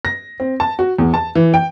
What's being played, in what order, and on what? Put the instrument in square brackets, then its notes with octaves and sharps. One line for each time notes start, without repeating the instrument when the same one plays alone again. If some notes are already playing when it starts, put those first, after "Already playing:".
[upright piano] A#6
C4
A5
F#4
E2
A5
E3
G5